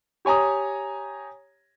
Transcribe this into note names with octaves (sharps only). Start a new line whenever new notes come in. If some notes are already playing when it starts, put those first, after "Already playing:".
G4 C#5 G#5 A#5 D#6